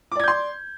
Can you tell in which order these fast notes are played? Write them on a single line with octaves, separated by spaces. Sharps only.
D6 D5 G#6 G6 C6